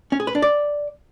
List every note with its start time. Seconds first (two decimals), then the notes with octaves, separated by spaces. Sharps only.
0.12 C#4
0.20 G#4
0.27 B4
0.35 D4
0.42 D5